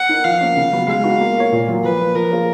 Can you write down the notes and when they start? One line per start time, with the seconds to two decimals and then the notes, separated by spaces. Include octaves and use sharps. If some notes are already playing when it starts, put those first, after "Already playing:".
Already playing: F#5
0.09 D#4 A#4
0.24 F3 F5
0.41 A#3 C#4
0.57 C#3
0.73 F#3 B3 F#4
0.88 G#3 F5
1.04 B3 D#4 F#4
1.20 A#3
1.36 F4 A#4 C#5
1.52 A#2
1.68 F#3 A#3 F4
1.84 F3 B4
1.99 A#3 F4
2.15 F3 A#4
2.31 A#3 F4 G#4 C#5